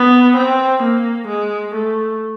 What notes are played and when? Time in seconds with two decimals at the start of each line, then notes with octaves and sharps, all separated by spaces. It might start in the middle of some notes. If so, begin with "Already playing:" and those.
Already playing: B3
0.37 C4
0.83 A#3
1.28 G#3
1.75 A3